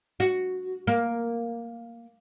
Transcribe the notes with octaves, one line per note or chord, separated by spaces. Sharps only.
F#4
A#3